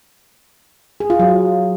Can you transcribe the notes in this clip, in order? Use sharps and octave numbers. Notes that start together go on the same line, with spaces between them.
G#4
F4
F#3